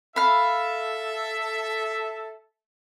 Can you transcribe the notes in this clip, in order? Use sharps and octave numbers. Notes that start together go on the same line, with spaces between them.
A4 E5 F5 B5